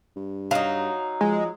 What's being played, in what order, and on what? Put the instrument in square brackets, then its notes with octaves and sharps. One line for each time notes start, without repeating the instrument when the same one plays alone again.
[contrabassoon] G2
[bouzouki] F#3 D#4 [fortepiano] F5
[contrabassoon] F3 [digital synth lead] G#3